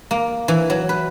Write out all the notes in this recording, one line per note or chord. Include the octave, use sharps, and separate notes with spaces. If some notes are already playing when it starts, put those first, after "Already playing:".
A#3
E3
F#3
B4